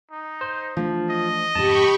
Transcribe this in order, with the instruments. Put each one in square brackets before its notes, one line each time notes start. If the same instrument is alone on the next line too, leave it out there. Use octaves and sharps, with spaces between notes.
[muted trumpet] D#4
[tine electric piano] C5
[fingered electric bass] E3 A3 D4 [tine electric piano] F3
[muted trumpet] D#5
[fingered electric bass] F2 G#2 C#3 [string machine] G4 B5 C#6 [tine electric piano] A5